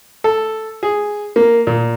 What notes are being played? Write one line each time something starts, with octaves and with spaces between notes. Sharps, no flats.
A4
G#4
A#3
A#2